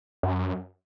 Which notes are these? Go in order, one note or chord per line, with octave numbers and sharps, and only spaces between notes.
F#2